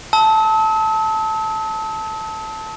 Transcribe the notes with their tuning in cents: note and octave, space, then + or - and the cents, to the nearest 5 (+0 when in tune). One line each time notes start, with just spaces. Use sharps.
A5 +0 E6 -45